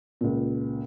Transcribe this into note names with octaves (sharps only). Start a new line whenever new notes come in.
C#2 A#2